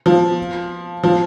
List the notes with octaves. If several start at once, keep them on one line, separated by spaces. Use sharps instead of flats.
F3
F3